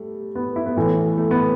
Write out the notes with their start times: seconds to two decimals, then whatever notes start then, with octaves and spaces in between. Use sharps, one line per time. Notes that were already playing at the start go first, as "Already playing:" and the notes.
Already playing: G3 A3
0.35 B3
0.56 E4
0.66 B3
0.76 A2 E3 A3
1.18 A3
1.31 B3